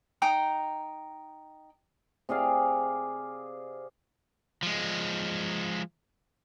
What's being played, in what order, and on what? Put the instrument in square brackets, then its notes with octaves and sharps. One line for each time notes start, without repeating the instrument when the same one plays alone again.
[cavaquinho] D#4 G5 A#5 D#6
[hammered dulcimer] C3 G#4 D5 F5
[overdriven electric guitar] F3 G#3